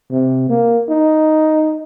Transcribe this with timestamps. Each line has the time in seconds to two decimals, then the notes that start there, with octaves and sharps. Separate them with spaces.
0.11 C3
0.50 A#3
0.89 D#4